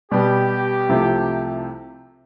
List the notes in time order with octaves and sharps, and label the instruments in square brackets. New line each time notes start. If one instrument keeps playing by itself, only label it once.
[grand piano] B2 G3 B3 [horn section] G4
[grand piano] C2 C3 F3 A3